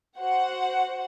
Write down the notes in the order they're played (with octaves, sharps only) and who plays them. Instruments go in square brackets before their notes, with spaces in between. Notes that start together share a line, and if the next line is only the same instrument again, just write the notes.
[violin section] F#4 C5 F#5